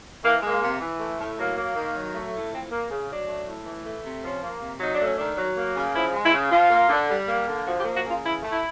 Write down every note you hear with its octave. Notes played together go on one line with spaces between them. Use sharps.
E3 A#3
G#3 A#3
C3
E3
A3
A2
F#3 A#3
A#3
D#3
F#3
A3
A2
F3 C4
A#3
C#3
F#3 D4
A3
A2
E3
A3
C3
F3 C#4
A#3
C3
F#3 D#4
D4
A3 C#4
D#3 D4
F#3
A#3
C#3
F3 E4
G#3
E4
C#3
F3 F4
A#3
D3
G3
A#3
D3
F3 F#4
G4
A#3
F#4
C#3 F4
E3 E4
A3
E4